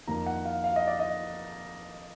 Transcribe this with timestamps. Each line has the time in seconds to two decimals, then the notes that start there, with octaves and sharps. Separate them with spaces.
0.07 F2 D#3 A#3 A#5
0.26 F#5
0.45 F5
0.64 F5
0.76 D#5
0.87 D5
0.99 D#5